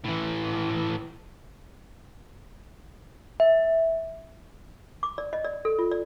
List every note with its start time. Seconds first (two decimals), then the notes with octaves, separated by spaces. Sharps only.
0.05 A2 E3
3.40 E5
5.03 D6
5.18 D5
5.33 D#5
5.44 D5
5.65 A4
5.79 F4
5.92 D5